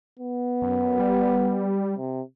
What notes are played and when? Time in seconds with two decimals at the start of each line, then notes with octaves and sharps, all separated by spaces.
0.19 B3
0.62 F#2
0.99 G3
1.97 C3